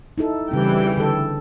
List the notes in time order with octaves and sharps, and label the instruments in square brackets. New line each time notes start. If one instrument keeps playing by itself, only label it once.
[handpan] D#4 E4 A4
[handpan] C#3 C4 [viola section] E3 G3 G5
[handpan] D3 A4